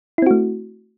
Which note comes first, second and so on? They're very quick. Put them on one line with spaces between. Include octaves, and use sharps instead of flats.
E4 C4 F#4 A3